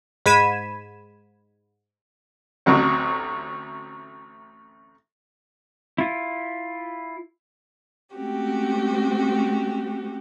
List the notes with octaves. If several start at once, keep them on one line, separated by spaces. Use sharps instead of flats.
G#2 B5 G#6 B6 D#7 E7
A1 D2 F#3 C4
E4 F4
G#3 A3 C4 C#4 F#4 G4